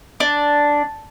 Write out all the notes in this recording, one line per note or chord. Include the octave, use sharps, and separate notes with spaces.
D4